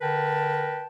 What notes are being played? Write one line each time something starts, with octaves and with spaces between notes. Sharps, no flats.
D3 A#4 B4 G5 A5